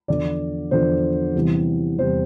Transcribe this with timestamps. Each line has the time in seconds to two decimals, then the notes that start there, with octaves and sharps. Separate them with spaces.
0.08 E2 D3 F3 D5
0.71 E2 D3 F3 C5
1.35 E2 C3 E3 G3
1.98 E2 C3 E3 G3 C5